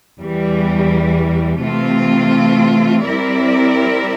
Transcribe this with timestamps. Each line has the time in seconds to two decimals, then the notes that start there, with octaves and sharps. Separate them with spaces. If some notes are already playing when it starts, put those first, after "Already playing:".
0.19 E2 E3 G3
1.62 C3 E3 A3 C4 F4
3.05 G3 C4 E4 A#4 D5